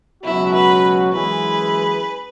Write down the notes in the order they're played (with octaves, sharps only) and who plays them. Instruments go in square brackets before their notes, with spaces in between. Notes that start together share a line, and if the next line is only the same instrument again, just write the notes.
[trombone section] C#2 B2 F#3 C#4 F#4 [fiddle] E4
[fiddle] B4
[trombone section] F#2 E3 G#3 E4 G#4 [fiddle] B4